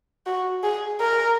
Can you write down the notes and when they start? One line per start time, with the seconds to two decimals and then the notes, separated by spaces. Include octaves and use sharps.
0.26 F#4
0.63 G#4
1.00 A#4